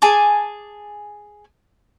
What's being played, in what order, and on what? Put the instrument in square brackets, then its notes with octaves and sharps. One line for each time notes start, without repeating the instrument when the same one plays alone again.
[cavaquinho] G#4 G#5 A5 D6